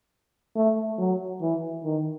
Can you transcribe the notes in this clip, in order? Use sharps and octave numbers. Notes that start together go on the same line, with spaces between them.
A3
F#3
E3
D#3